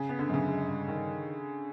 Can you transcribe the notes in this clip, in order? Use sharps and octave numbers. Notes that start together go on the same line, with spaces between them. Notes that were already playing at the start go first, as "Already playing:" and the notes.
Already playing: C#3
B3
D3
F#2 C#3
G#3
G2
D#3